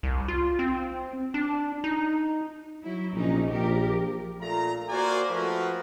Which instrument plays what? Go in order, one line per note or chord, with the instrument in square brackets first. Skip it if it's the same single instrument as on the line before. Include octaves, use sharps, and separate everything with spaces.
[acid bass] C2
F4
C4
D4
D#4
[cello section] F#3 E4
[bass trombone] A#1 [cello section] C3 C#4 D#4
[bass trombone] A#1 [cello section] F3 G4 A#4
[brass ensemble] A#2 A3 F4 A#5
A#3 F#4 A#4 C5 D5 G#5
F3 A3 F#4 A#4 B4